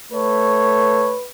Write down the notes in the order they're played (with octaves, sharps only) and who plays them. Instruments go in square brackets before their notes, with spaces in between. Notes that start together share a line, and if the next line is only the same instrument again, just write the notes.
[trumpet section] A3 C#5 [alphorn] B4